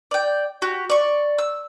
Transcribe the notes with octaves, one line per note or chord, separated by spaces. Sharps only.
D5 G5
F#4 G4
D5 C#6
E6